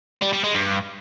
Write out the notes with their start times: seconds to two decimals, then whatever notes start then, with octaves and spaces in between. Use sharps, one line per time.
0.22 G3
0.33 G3
0.44 G#3
0.55 G2